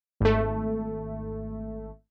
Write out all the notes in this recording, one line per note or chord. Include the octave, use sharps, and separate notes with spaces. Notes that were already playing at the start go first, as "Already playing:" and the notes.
G#1 A3